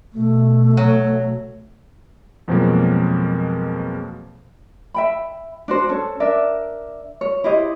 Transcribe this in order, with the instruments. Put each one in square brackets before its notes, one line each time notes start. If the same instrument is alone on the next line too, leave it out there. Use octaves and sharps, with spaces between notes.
[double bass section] B2 [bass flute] A3
[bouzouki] F#3
[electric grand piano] F2 B2 F3 F#3 G#3 A#3
[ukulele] E5 G5 B5
D4 F#4 C5
C#4 A4
D4 A#4 D5 E5
C#5
E4 G4 C5 D#5